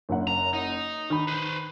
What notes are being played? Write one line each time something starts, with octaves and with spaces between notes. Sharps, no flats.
F#1 F#2 F#5
A#5
D#4
D#3 B5
B4 C5